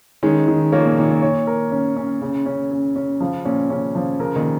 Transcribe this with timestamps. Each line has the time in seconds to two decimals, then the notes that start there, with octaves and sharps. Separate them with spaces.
0.23 D#3 G#3 C#4
0.48 D#3
0.72 F3 A#3 C#5
0.85 A#2
0.97 A#2 D#3
1.10 A#2
1.22 C#5
1.47 A#4
1.72 C#4
1.96 C#4
2.21 C#3 C#4
2.46 C#4
2.71 C#4
2.96 C#4
3.21 C#3 F3
3.45 A#2 C#4
3.70 C#3 C#4
3.95 A#2 F3
4.20 C#3 A#4
4.36 A#2 D#3